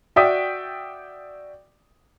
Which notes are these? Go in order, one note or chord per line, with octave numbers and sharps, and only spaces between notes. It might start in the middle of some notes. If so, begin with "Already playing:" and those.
F#4 D5 E5 G5 D#6